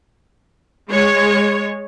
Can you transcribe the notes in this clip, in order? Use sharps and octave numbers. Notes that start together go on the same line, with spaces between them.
G#3 C#5